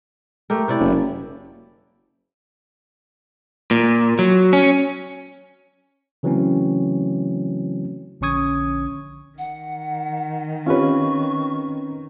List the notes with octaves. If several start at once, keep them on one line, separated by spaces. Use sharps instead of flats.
A3 G4 A#4
C3 E4 D5
F#1
A#2
F#3
C#4
C#3 E3 F#3 A3 C4 C#4
A#1 D3 C#4 C#6 D#6 G#6
D#3 F#5
C4 C#4 F4 G4 B4 C#5 C#6